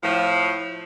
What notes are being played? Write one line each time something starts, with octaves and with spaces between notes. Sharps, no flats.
A2 F3